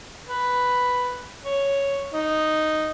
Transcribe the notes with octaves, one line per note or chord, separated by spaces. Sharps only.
B4
C#5
D#4